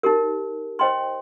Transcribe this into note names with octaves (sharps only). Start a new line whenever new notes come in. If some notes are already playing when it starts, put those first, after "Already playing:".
D#4 G4 A#4
C5 D#5 G5 C6